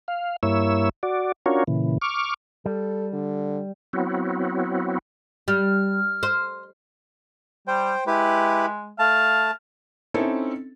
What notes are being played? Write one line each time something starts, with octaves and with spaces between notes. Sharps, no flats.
F5
G2 A#3 E4 C#5 E6
F#4 D5
C#4 D4 F4 F#4 A#4 C#5
A#2 C#3 E3
C#6 D6 F6
G3 A4
D3
F#3 B3 C4 E4 F#4
G3 F6
C5
G3 C5 G5
G#3 E4 G4 B4
A3 F5 A5
C4 C#4 D#4 E4 A4